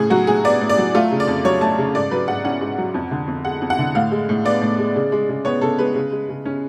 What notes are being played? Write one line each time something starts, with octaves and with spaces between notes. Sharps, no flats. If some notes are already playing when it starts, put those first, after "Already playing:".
Already playing: A2 C#3 G#4
F#3 F#4
A2 G#4
B3 D5
A2
D5
F#3
A3 F4
C#3
D5
F2
F#3 C#5
A3 A5
C#3
G#2 D5
F#3 B4
G#2 F#5
C#4 F#5
G#2
F#3
F2
D3
F2
G#3 F#5
F2
F#5
D3
A2 F5
G#3
A2
B3 D5
A2
G#3
C#3
G#3
C#3
B3 C#5
C#3 A4
G#3 B4
C#3
G#3
C#3
C#4